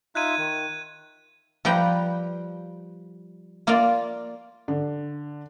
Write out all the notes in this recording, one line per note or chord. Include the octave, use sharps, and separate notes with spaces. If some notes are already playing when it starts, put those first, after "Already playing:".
D#4 F4 E5 F#6 G#6 D#7
D#3
F3 G3 B4 G5 A#5
A#3 F4 A#4 D5 F5
D3